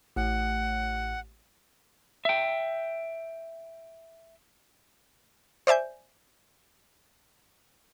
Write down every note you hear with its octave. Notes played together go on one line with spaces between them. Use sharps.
A1 F#5
E5 G5
C5 D5 E5 G#5 G6